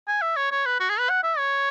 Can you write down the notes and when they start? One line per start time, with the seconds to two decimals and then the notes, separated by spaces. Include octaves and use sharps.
0.08 G#5
0.22 E5
0.36 C#5
0.51 C#5
0.66 B4
0.80 F#4
0.89 G#4
0.99 B4
1.09 F#5
1.24 E5
1.38 C#5